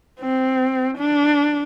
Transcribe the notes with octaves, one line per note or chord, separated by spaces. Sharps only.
C4
D4